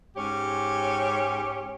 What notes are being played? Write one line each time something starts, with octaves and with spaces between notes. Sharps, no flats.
G#2 C#4 G4 C#5